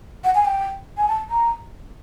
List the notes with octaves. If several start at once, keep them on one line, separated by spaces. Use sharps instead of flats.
F#5
G#5
G5
G#5
A5
A#5